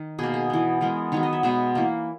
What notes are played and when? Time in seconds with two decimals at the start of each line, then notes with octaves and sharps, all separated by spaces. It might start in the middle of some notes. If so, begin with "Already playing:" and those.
Already playing: D#3
0.19 B2 A#3 G#4
0.34 G#4
0.50 E3 B3
0.81 E3 G#3 B3 A#4
1.12 D#3 F#3 B3 C#5
1.23 D#5
1.33 E5
1.43 B2 G#3 B3 E5
1.75 E3 A#3